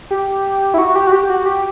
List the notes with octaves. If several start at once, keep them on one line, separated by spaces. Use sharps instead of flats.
G4
E4
F#4
G4
F#4
G4
G4
F#4
G4